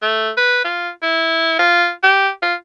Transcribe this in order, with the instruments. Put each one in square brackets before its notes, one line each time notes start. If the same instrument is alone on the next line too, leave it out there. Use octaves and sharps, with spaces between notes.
[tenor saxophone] A3
B4
F4
E4
F4
G4
F4